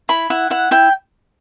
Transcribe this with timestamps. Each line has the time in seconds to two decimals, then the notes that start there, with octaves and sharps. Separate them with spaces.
0.09 E4 B5
0.30 E4 F#5
0.50 E4 F#5
0.71 E4 G5